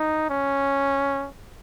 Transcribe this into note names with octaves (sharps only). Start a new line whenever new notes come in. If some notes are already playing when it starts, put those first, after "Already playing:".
Already playing: D#4
C#4